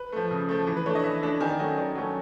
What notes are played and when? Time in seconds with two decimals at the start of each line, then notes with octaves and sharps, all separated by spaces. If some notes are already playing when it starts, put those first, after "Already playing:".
Already playing: B4
0.12 F3 A3
0.31 C#3
0.49 F3 A3
0.67 E3
0.77 B4
0.86 A3 D4 C#5
0.95 D#5
1.04 E3 E5
1.22 A3 D4
1.41 D#3 G#5
1.50 D5
1.59 F#3 A3 C#4 D#5
1.78 D#3 D5
1.95 F#3 A3 C#4